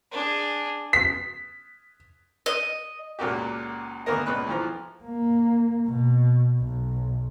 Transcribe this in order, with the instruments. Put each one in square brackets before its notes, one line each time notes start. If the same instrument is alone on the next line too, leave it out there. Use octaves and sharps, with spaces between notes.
[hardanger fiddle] D4 G#4
[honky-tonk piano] B6
[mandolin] D#5
[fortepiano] C#2 A#2 A#3 F#4 G4
D2 A#3 B3 A#4 D#5
C#2 A#2 B4 F#6
B1 E3 F3 A#5
[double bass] A#3
B2
B1